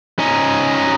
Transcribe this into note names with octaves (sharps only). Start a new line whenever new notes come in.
C#4 D#4